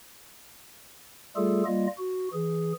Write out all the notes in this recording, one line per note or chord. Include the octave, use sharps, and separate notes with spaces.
G3 A3 F4 G#4 A4
G3 A#3 F4 D#5
F#4
E3 G#4